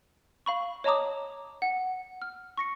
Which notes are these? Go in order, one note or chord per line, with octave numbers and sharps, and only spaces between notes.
F5 B5 C#6
C#5 D#5 A5 A#5 D6 D#6
F#5
F6
C#6 A#6 C#7